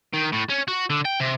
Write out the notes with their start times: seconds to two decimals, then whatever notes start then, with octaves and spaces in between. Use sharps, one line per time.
0.14 D#3
0.33 A2
0.50 C#4
0.68 F#4
0.90 D3
1.05 G5
1.20 C3